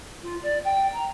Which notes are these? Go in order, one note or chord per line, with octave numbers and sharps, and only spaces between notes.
F4
D5
G5
A#5